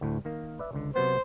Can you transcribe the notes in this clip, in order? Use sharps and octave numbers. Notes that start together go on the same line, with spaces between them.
D2 A2
D#3 A#3
B4 D5 E5
C#2 D3
C3 F#3 B3 C5